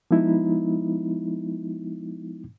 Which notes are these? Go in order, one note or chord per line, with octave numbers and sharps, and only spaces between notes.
F3 G#3 B3 D#4 E4